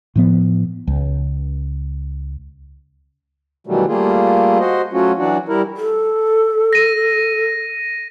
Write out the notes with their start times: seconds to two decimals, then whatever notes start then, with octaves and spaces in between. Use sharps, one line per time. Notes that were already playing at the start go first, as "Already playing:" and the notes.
0.16 A2 F3 B3
0.87 C#2
3.67 B2 D#3 E3 F#3 G3 A3
3.87 G3 A3 A#3 F4 G#4
4.60 F#4 C5 D#5
4.93 F#3 A3 C#4 F4 F#4
5.18 E3 F#3 D4 F#4
5.49 G3 E4 A#4
5.77 A4
6.73 A#6 D#7